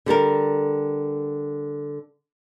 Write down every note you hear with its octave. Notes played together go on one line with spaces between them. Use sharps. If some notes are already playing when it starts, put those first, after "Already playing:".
D3 G3 A4 A#4